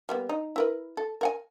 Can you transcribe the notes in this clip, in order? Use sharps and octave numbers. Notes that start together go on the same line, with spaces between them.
G3 A#3 B3
D#4
E4 A#4 B4
A4
A#4 F#5 G#5